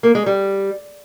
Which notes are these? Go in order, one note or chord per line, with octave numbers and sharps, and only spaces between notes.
A#3
G#3
G3